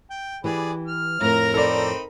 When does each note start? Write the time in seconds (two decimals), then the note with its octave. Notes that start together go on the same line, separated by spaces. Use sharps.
0.10 G5
0.44 E3 G4 G#4 B4 D5 B5
0.87 F6
1.21 F2 A2 A#4 A#5
1.54 C4 D#4 A4 D5 B5